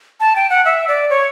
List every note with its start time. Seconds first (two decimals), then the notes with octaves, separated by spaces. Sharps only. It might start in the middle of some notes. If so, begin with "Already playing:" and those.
0.20 A5
0.36 G5
0.50 F#5
0.65 E5
0.88 D5
1.10 C#5